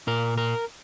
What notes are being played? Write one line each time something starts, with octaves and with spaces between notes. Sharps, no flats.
A#2 A#4
A#4